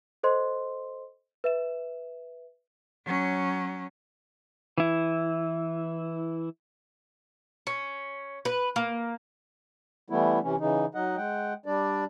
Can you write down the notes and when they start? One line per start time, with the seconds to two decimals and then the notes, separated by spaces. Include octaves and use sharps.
0.23 A4 C5 D#5 C6
1.44 B4 E5 E7
3.05 F#3 C#4
4.78 E3 E4
7.67 C#4
8.45 B4
8.76 A#3
10.10 E3 G3 A3 B3 E4
10.43 C3 E3 C#4
10.60 C#3 E3 D#4
10.95 F#3 D#4 D#5 F#5
11.17 G#3 F#5 G5
11.66 G3 D4 D5